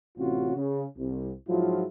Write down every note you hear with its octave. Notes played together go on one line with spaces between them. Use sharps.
A1 C3 C4 C#4 F4 F#4
C#3
C2
G#2 F3 F#3 G#3 E4 F4